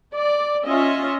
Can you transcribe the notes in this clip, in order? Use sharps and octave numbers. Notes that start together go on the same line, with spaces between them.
D5
C#4 F4 D#5 E5